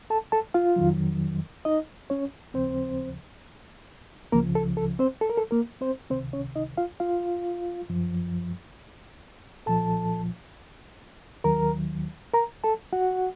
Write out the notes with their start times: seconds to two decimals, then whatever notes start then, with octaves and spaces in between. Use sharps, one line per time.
0.10 A4 A5
0.32 A4 A5
0.54 F4 F5
0.76 F2 D#3 F#3
1.65 D#4 D#5
2.10 C#4 C#5
2.54 D#2 C#3 F3 C4 C5
4.32 C#2 C#3 F3 A#3 A#4
4.55 A4
4.77 A4
4.99 C4 C5
5.21 A4
5.30 A#4
5.37 A4
5.51 A#3 A#4
5.81 C4 C5
6.11 C#2 C3 D#3 C4 C5
6.33 C#4 C#5
6.56 D#4 D#5
6.77 F4 F5
7.00 F4 F5
7.89 F#2 F3
9.66 C2 A#2 F3 A4 A5
11.44 D#2 D#3 F#3 A#4 A#5
12.34 A#4 A#5
12.64 A4 A5
12.93 F#4 F#5